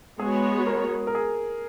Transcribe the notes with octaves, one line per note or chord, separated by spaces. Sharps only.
G#3 B3 F#4 G#4 C#5
A#4
A#4
G#4